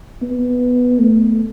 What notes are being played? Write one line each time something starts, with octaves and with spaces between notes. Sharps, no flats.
B3
A3